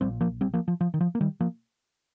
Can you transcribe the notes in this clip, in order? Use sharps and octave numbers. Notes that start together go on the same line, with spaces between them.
A#1 A#2 G3 C4
F3 A#3
G3 C4
F3 A#3
F3
F3
D#3
F3
A#3
D#3 G3
F3 A#3